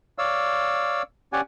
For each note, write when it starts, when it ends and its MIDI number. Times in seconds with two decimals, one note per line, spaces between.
0.18 1.02 73
0.18 1.02 74
0.18 1.02 77
0.18 1.02 88
1.33 1.41 61
1.33 1.41 67
1.33 1.41 74
1.33 1.41 78
1.33 1.41 80